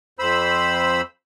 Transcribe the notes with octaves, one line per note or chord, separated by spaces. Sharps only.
F2 C5 B5 E6